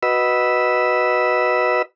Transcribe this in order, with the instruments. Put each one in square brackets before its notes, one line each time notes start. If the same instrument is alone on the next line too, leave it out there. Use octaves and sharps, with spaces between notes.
[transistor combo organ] F#4 B4 D#5 B5 E6